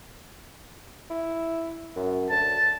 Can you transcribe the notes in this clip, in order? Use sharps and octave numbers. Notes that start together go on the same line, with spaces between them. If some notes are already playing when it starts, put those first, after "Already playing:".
E4
F#2
D2 A5